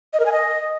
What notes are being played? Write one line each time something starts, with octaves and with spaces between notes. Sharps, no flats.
D#5
A#4
G#5
D#5